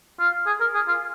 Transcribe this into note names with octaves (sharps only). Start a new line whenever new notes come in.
F4
G#4
A#4
G#4
F4